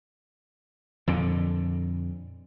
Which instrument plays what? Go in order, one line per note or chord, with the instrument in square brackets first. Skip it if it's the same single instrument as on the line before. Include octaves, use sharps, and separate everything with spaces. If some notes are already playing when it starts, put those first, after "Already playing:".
[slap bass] F2 A#2 D3